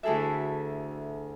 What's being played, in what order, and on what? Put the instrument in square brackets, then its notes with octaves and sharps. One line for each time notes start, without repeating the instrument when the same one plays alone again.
[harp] D2 E4 G#4 A4 E5